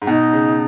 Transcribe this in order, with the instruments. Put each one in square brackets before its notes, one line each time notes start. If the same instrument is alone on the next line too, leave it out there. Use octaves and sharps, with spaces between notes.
[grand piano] G#2
[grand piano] B2 [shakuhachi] D#4
[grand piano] C#3